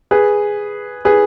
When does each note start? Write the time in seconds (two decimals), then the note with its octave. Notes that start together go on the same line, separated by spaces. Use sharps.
0.11 G#4 B4
1.05 G#4 B4